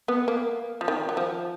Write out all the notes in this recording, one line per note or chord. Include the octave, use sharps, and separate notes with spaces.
B3
A#3
F3
D#3
F#3
F3